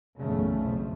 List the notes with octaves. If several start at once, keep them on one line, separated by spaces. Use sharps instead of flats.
F#1 B1 E2 C#3 A3
F2